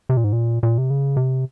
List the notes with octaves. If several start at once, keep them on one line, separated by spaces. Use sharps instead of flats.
C3
A#2
G#2
A#2
A#2
C3
C#3
C3